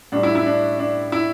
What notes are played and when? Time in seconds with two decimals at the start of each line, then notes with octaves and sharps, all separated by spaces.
0.12 A2 G3 D4
0.23 E4
0.35 E4
0.46 D4
0.79 D4
1.12 E4